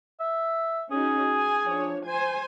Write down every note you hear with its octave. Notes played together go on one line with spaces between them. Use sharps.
E5
C#4 D#4 F#4 G#4
G#5
F3 D4 C#5
C5 G#5